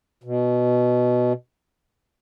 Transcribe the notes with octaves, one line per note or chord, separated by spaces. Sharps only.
B2